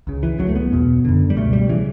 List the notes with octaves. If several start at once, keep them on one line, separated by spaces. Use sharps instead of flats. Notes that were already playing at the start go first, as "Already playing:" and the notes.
C#2 C#3
E3
C#2 C#3 F#3
A3
B3
E2 B2
F#2 D3
G3
C#2 B2 A3
G3
C#3 E3